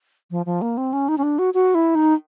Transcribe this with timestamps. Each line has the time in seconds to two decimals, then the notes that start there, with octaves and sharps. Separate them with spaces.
0.31 F3
0.46 F3
0.62 A#3
0.77 C4
0.93 C#4
1.09 D#4
1.18 C#4
1.23 D4
1.39 F#4
1.54 F#4
1.75 E4
1.95 D#4